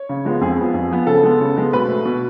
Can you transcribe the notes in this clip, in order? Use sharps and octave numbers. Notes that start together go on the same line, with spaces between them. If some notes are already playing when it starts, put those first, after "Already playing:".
Already playing: C#5
C#3
F3 G#3 B3
F2 G#4
F3 B3
F2
F3 B3
C#3 A4
G#3 B3
C#3
G#3 B3
B2 B4
A3
B2